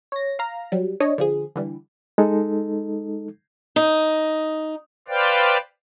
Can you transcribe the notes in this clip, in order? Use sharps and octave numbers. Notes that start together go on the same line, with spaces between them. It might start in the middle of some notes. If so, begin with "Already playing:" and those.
C#5 A#6
F5 A#5
F#3 G3
D4 C#5 D#5
D3 F3 G#4
D3 E3 G3
G#3 D#4 A4
D#4
B4 C5 D5 F5 G5